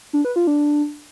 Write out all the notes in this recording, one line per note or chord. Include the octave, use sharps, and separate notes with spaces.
D4
B4
F4
D4